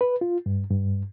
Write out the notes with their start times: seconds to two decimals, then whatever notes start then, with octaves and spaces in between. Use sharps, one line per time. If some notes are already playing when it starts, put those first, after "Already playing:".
0.01 B4
0.21 F4
0.46 G2
0.71 G2